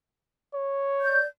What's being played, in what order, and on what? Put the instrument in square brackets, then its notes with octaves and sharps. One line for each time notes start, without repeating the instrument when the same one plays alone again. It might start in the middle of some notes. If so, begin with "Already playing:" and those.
[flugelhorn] C#5
[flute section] D5 G6